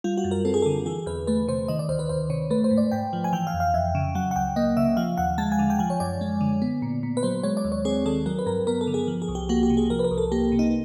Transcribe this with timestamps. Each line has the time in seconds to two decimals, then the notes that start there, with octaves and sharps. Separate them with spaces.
0.04 G3 F4
0.18 F#4
0.24 F#2
0.31 A#4
0.45 C4 A4
0.54 G#4
0.62 D3 A4
0.86 E3 G#4
1.06 E2 B4
1.27 A3 B4
1.48 C3 C5
1.68 D#3 D#5
1.79 D5
1.89 D2 C5
1.99 B4
2.09 D2 C5
2.30 C3 C#5
2.50 A3 B4
2.64 C5
2.71 G#2
2.78 D5
2.92 G#2 G5
3.13 F3
3.24 G#5
3.33 E3 G5
3.47 F5
3.53 F2
3.60 F5
3.74 F2 E5
3.95 C#3
4.15 F#3 F#5
4.31 F#5
4.35 C#2 G5
4.56 A#3 D#5
4.77 C#3 E5
4.97 F3 F5
5.18 D#2 F#5
5.38 G#3 A5
5.52 G#5
5.59 D3
5.70 G5
5.79 F3 G#5
5.90 C#5
6.00 F#2 D5
6.21 G#3
6.41 D3
6.62 B3
6.82 A#2
7.03 A#2
7.17 B4
7.23 F#3 C5
7.43 G#3 C#5
7.57 D5
7.65 D#2
7.72 C#5
7.85 C4 G#4
8.06 D#3 A4
8.26 F#3 A#4
8.39 B4
8.46 G2 A#4
8.67 B3 A#4
8.81 A4
8.87 D3
8.94 G#4
9.08 F3
9.22 G#4
9.28 C2
9.35 G4
9.49 A#3 F#4
9.63 G4
9.70 C3
9.77 G#4
9.90 F3 A#4
9.99 B4
10.04 A#4
10.11 C2
10.18 A4
10.32 A#3 G4
10.52 C3
10.59 D#4